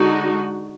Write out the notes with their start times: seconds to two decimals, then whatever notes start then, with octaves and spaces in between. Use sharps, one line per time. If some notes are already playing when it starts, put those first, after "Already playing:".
Already playing: D3 G#3 D#4 F#4